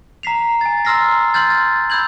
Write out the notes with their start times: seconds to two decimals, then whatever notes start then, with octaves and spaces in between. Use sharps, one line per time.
0.23 A#5 B6 C7 F7
0.61 G#5 A6
0.85 A#5 C6 E6 F6 A#6 C7
1.34 C6 F6 G6 A6
1.90 B5 E6 G6 G#6 F#7